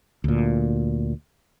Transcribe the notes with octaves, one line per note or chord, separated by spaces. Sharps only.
D2 A#2